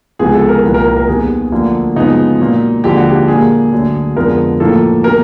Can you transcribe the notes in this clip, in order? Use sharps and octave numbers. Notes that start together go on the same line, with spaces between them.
C#2 C3 F3 G#3 B3 G#4
A4
A#4
C2 A#2 F3 B4
A#4
A#4
A#4
D#2 D#3 G3 B3 G#4
D2 D3 F3 A#3
F#2 C#3 F3 G#3 B3 D#4
A#2 F#3 A#3
D#2 D3 F3 G#3 G4
F#4
G4
A#2 G3 A#3 G#4
D2 D3 F#3
F2 D3 F3 G#3 B3 A#4
A2 F3 A#3 A4
B2 G3 A#4